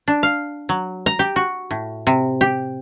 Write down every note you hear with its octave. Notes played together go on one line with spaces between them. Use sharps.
D4
F5
F#3
A#5
G4
F#4
A2
C3
G4